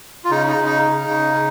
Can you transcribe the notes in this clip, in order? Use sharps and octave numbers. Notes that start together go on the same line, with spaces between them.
F4
C#3 D#4
D#4
C#3
D#4
C#3
C#3
C#3